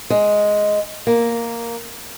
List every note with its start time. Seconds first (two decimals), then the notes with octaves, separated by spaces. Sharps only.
0.10 G#3
1.07 A#3